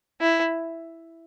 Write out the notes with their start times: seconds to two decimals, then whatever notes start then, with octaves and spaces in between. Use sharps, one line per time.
0.21 E4